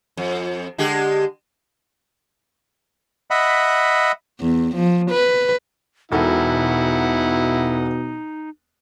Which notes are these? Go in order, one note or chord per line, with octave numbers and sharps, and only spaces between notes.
F2
D3 G#3 G4
D#5 E5 F#5 B5
E2
F3
B4
E1 B2 D#4 E4 F#4 A4 F#5